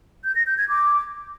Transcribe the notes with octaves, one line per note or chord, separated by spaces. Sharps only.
G6
A#6
G6
G#6
D6